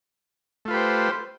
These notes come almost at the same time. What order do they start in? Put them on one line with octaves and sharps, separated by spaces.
A3 F4 B4 G4 C5